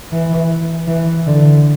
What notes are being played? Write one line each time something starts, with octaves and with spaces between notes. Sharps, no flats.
E3
E3
D3